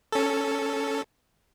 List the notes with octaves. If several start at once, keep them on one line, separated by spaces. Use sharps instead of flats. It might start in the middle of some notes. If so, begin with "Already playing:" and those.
C#4 A4